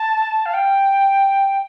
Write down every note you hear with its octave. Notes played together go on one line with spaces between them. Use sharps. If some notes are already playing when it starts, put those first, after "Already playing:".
Already playing: A5
F5
G5